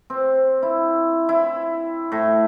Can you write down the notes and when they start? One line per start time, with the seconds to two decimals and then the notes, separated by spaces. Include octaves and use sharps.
0.10 C4
0.63 E4
1.29 E4
2.12 A2